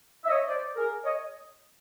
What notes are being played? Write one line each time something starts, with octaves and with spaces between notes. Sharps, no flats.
E5
C#5 D#5
C5 D5
G#4 A#4
C#5 D#5